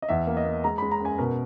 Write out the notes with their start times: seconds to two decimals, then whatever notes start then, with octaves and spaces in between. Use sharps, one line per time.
0.02 D#5
0.09 E2 E5
0.27 A#3
0.37 D#5
0.45 A#3
0.64 G#3 A#5
0.78 G#3 B5
0.91 A#5
1.00 F#2 G#5
1.18 B2 A#4